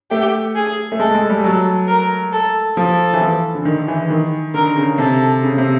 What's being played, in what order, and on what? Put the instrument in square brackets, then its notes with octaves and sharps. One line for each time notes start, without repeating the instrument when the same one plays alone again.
[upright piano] A3 [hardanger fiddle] G4
[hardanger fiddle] G#4
[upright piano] A3
[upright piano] G#3 [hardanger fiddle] A4
[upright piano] G#3
G3
[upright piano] F#3 [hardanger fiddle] A4
[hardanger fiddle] A#4
A4
[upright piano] F3 [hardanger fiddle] A4
[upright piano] E3
F3
D3
D#3
E3
D#3
[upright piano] D3 [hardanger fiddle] A#4
[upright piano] C#3
[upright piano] C3 [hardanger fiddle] A4
[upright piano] C#3
C3